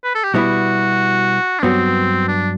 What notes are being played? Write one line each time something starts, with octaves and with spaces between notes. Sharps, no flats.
B4
A4
G4
B2 G3 B3 E4 F#4
D4
G2 F#3 B3 C4 F#4
D4